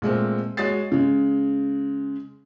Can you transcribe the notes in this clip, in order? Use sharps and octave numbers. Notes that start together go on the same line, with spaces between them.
A#2 G#3 A3 C4
G#3 F#4 C#5 D#6 A6 C7
C#3 G#3